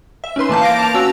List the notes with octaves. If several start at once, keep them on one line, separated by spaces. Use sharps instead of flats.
E5
C#4 D#4 B4 C6
E3 A#3 A5 G6
F5 D6 A#6 D7
A5 F7
C#4 F#4 E6